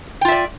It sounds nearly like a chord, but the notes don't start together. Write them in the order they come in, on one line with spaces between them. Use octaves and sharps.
G5 F4 E5 D5